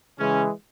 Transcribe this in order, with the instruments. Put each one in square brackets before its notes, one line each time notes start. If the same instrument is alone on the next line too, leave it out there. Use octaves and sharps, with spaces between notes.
[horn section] C#3 E3 G#3 C#4